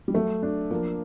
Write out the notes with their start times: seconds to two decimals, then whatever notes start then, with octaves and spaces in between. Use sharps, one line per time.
0.08 G3
0.14 F#3 A3
0.43 D4
0.71 F3 A#3